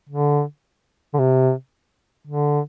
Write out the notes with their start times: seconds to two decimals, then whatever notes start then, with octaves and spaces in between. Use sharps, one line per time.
0.09 D3
1.14 D3
1.19 C3
2.27 D3